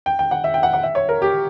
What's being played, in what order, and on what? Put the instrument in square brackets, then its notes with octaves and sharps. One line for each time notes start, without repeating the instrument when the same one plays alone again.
[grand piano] G5
G5
F#5
E5
G5
F#5
F#5
E5
C#5
A#4
G4